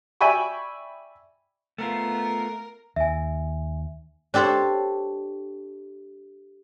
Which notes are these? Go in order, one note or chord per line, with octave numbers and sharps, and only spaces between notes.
D5 E5 G5 G#5 B5 C#6
A3 B3 F4 A#4
D#2 E5 G#5
D4 G4 A4 C5 C#5